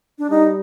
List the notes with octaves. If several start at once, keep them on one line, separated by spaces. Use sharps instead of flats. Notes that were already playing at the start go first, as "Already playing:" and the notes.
D4
G3 D#4